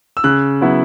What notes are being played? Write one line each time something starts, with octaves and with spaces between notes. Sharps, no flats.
E6
C#3 F#6
F#3 B3 E4